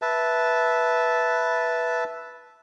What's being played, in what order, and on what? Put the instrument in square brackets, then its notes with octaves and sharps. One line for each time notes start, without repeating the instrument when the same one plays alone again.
[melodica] B4 E5 A5